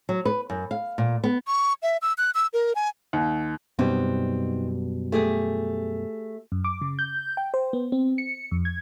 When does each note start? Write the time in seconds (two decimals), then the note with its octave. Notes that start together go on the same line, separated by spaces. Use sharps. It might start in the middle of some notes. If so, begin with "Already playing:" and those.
0.09 F#3
0.25 B4
0.50 F#2
0.71 F5
0.98 A#2
1.24 B3
1.47 C#6
1.83 E5
2.02 E6
2.18 F#6
2.35 E6
2.53 A#4
2.75 G#5
3.13 D#2
3.79 F#2 B2 G3 B3 C4 D#4
5.12 A3 G4 G#4
6.52 F#2
6.64 D6
6.81 C#3
6.99 G6
7.37 G5
7.54 C5
7.73 B3
7.92 C4
8.18 C#7
8.51 F2
8.65 G#6